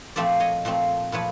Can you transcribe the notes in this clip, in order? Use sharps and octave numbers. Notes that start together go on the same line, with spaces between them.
A#2 F3 A3 C4 D5 E5
C#5 D#5
A#2 F3 A3 C4
A#2 F3 A3 B4 C#5